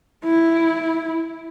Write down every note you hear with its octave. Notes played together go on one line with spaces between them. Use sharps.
E4